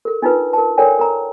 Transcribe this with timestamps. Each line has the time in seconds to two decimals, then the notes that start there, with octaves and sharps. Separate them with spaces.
0.05 A4 A#4
0.22 D4 D#4 F4 A#4 B4
0.53 A#4 A5
0.78 A4 A#4 C#5 D5 G5 G#5
0.99 A#4 A#5